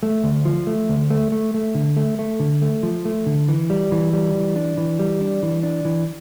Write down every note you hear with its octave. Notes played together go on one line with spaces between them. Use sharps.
A3
D2
F3
A3
D2
A3
A3
A3
D3
A3
A3
D3
A3
F3
A3
D3
E3
G3
E3
G3
E3
D4
E3
G3
D4
E3
D4
E3